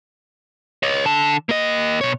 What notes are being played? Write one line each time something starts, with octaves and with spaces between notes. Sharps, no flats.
C#5 D#5
D3 A5
A#3 D#5
B2 C#5